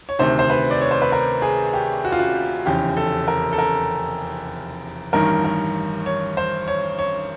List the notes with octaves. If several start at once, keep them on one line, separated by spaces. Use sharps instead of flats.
C#5
D2 C3 D#3 C5
C5
B4
D5
C#5
C5
B4
A#4
G#4
G4
F#4
F4
F#4
F1 E2 C#3 G4
A4
A#4
A4
A#4
A1 G2 D#3 A#4
A#4
C#5
C5
C#5
C#5